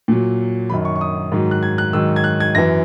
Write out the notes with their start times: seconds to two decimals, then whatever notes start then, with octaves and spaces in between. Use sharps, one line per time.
0.08 A#2 F#3
0.70 F#2 D#3 F#3 B5
0.85 C#6
0.96 C#6
1.01 D#6
1.32 G#2 D#3 F#3
1.51 F#6
1.63 G#6
1.78 F#6
1.93 G#2 D#3 F#3 E6
2.16 G#6
2.24 F#6
2.40 G#6
2.55 F#2 E3 A#6